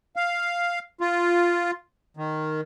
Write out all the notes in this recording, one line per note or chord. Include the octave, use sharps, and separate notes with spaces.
F5
F4
D#3